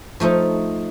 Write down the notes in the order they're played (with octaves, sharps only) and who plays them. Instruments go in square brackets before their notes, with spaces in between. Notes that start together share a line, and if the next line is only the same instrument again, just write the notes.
[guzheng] F3 A3 D#4 A4